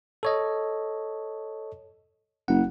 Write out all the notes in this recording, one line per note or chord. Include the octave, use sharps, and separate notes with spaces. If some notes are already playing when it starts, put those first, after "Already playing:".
A4 C#5 D#5
F#1 F#5